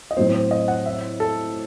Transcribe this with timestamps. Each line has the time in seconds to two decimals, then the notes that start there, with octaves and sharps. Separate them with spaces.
0.11 D#5
0.17 A2 F#3 C4 C5
0.34 C5
0.51 D#5
0.68 F#5
0.86 E5
1.20 A4